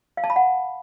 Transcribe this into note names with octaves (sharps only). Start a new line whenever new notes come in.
F5
A5
B5
F#5